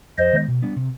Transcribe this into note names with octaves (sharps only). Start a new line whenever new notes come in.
F2 C5 D#5
D#3 G#3 B3
B2
G3 B3 D4
C3